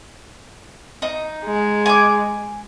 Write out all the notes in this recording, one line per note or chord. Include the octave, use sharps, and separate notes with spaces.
D#4
G#3
G#5 D6